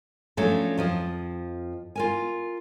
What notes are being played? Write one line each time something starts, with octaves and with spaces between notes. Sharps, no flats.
F3 F#3 A3 C#4 D4 A4
F2 F3 D#5
F4 A#4 G#5